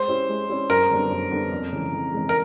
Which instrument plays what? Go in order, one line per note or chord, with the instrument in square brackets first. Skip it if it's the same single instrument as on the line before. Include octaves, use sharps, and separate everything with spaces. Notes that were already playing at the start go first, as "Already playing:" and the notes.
Already playing: [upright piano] G#3 [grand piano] C5
[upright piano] C#4 E4 G4
G#3
C#4 E4 G4
[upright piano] F#2 [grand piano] A#4
[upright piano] D3 G3 B3 D4
F#2
D3 G3 B3 D4
F2
C#3 E3 G#3
F2
C#3 E3 G#3
[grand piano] A#4